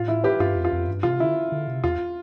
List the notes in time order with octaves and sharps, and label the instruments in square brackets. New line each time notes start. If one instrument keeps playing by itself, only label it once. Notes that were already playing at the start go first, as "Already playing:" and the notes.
Already playing: [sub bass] A2 [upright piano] F4
[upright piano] E4
G4 B4
[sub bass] G2 [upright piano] F4
[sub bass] F2
[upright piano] F4
[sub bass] F2
G2
[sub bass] C3 [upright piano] F4
[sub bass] D3 [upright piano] E4
[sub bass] D3
C3
[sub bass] E2 [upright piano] F4